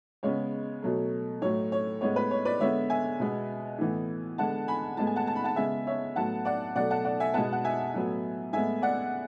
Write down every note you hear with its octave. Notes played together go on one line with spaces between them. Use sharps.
C#3 G#3 B3 C#5
B2 F#3 A3
A2 F#3 A3 C#5
C#5
A2 G#3 B3 C#5
B4
C#5
B4 D5
D3 G#3 B3 C#5 E5
E5 G#5
B2 G#3 B3
A2 E3 B3
D3 G#3 B3 F#5 A5
G#5 B5
A2 G#3 B3 A5
G#5
F#5 A5
A5
B5
F#5 A5
C#3 G#3 B3 E5 G#5
C#5 E5
A2 F#3 B3 F#5 A5
D5 F#5
B2 F#3 A3 D5 F#5
F#5 A5
D5 F#5
E5 G#5
B2 G#3 B3 F#5 A5
F#5
E5 G#5
A2 F#3 B3
A2 G#3 B3 E5 G#5
D5 F#5